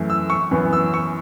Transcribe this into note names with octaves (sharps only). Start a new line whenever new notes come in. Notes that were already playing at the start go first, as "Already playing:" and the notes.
Already playing: F#2 E3 A3
E6
C#6
F#2 E3 B3
E6
C#6